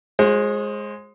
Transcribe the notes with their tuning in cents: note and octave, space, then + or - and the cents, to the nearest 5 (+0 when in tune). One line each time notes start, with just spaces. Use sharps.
G#3 +0 F#4 -40 C5 +35